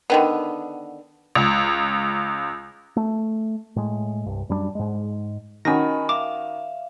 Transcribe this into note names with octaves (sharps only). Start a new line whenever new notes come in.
D3 D#3 B3
C#2
A3
A2 G#3
C2 G2
F#2 G3 A#3 D4
G#2 G#3
D#3 C#4 F#4 D#5 G#5 B5 A#6
E5 F5 D6